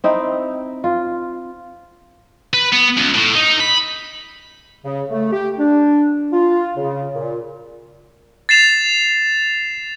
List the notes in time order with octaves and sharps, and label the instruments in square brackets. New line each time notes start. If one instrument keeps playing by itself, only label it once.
[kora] C4 D#4 E4
F4
[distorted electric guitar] B4
B3
C#2
A2
D#4
B5
[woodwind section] C#3
A3
G4
D4
F4
C#3
A#2
[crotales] A6 C7 E7 F7